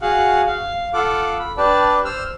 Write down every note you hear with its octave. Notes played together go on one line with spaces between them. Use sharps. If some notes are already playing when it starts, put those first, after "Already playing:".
F#4 G#4 F5 F#5
F5
F4 A4 F#5 D6
B5
D4 G4 B4 D5 A5
C5 E6 F6